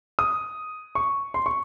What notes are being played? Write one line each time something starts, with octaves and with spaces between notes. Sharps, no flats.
D#6
C#6
C6
C#6